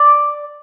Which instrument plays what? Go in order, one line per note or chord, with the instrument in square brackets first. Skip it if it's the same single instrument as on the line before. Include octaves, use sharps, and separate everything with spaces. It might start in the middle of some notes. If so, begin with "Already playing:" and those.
Already playing: [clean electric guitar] D5